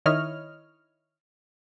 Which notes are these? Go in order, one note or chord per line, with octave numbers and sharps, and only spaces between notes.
D#3 E4 C#5 D#5 F6